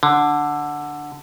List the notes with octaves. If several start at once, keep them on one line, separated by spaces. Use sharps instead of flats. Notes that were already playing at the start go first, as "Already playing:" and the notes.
D3